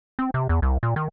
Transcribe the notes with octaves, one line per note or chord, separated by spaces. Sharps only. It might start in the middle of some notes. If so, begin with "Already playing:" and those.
C4
C3
E2
C2
A#2
D#3